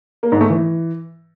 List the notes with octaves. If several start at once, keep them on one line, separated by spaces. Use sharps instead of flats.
A#3
G#2
A3
E3